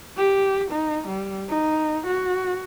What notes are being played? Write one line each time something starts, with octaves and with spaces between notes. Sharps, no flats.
G4
D#4
G3
D#4
F#4